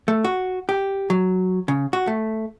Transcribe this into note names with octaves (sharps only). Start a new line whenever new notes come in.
A3
F#4
G4
F#3
C#3
F#4
A3